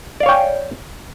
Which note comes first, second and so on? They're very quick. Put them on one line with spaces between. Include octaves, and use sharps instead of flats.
D5 F5 C#5 G5 G#5